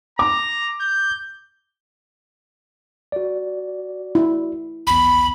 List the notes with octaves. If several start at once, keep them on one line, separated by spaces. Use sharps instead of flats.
A#5 D6
G6
F#4 D5
E4
B1 E2 B5